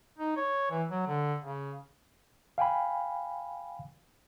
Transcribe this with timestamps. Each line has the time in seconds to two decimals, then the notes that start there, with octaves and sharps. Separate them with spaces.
0.18 D#4
0.37 C#5
0.71 E3
0.90 F#3
1.07 D3
1.43 C#3
2.58 F5 G5 G#5 B5